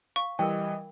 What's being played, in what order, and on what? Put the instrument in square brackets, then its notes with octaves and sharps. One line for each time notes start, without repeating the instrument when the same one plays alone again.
[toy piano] F5 [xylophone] C#6
[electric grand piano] E3 G3 [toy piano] A#4 G5 [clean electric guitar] D#5